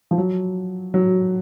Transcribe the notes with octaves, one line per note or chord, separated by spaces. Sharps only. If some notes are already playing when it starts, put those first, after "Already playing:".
F3
F#3
F#3